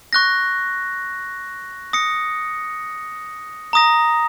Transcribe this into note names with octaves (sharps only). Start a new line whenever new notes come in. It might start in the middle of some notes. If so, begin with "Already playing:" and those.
C#6 F#6 A#6
D#6 A#6 C#7
A#5 D#6 A#6